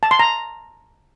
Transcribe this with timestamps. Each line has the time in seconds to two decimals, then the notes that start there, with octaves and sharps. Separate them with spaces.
0.03 A5
0.11 C6
0.20 A#5